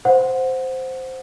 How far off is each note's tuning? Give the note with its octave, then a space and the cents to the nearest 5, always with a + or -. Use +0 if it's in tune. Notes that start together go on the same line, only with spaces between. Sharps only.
C5 -5 F#5 -15